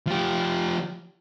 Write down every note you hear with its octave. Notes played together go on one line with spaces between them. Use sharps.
F3 G4